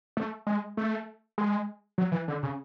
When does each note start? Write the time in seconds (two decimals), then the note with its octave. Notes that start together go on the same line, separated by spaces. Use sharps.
0.17 A3
0.47 G#3
0.77 A3
1.38 G#3
1.98 F#3
2.12 E3
2.28 D3
2.43 C#3